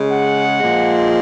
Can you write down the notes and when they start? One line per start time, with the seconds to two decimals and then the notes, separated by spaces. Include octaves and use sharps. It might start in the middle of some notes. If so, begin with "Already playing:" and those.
Already playing: C#3 G#3
0.11 F#5
0.60 A#2 F3 G#3